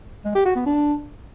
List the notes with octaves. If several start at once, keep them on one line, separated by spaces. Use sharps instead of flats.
G#3
G4
F#4
B3
D4